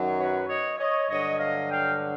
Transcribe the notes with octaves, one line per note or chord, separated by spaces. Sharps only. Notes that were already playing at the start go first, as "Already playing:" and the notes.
Already playing: F#2 D#3 F#3
B4 C#5
C#5 D#5
C#5 D#5
G2 D3 F#3 C#5 D#5
D#5 F5
F5 G5